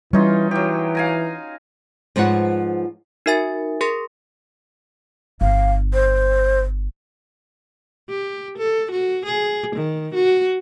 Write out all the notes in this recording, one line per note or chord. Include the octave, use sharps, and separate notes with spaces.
E3 G3 C#4 D#4 F4
E3 F#3 G4
F5 G#5 A#5
G#2 F3 B4 C#5 F#5
D#4 F#4 A#4 E5 G#5 A6
G#4 A#4 C6 A#6
G1 F5
C5
G4
A4
F#4
G#4
D#3
F#4